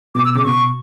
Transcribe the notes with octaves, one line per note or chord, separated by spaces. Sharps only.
B2 D6
E6
C#3 D6
B2 C#6